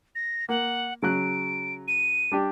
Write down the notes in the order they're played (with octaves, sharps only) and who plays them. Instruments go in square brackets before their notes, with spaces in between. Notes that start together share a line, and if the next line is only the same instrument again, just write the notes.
[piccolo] A#6
[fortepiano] A#3 [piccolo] F#5
[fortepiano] C#3 F#3 F#6 [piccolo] D7
[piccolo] D#7
[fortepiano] G3 D4 G4